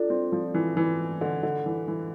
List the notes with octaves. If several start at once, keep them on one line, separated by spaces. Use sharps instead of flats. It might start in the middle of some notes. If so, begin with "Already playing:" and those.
Already playing: D4 F4 A4 D5
C4
F3
E3
E3
D3
D3
E3
E3